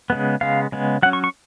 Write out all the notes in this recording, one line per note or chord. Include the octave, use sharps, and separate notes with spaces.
C#3 G#3 B3
C#3 G#3 B3 F5
C#3 G#3 B3
F#3 C#4 F#5
C#6
C#6